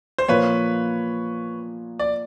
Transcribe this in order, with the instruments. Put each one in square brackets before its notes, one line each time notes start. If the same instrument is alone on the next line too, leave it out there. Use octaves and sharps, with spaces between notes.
[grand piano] C5
[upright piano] A#2 F3 A#3 [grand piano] B4 C#5
[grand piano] D5